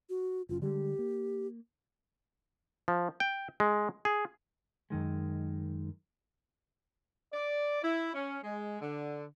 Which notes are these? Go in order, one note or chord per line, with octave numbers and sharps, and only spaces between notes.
F#4
F#1 F#2 F4
D3 G3 G#3 G4
A#3
F3
G5
G#3
G#4
F#2 D#3 G#3
D5
E4
C#4
G#3
D3